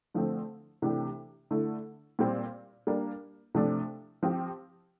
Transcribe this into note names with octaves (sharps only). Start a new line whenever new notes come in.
D3 F3 A3 C4
C3 E3 A3 D4 G4
D3 A3 E4
A#2 G3 C4
G3 A#3 D4
C3 F3 A3 D4
F3 C4 G4